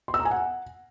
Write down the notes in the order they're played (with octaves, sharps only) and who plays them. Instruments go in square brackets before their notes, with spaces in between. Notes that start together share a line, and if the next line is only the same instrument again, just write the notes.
[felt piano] C6
E6
A#5
G#5
F#5